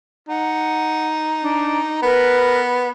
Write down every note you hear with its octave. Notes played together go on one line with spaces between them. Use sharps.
D#4 F#5
D4
B3 A#4 B4 B5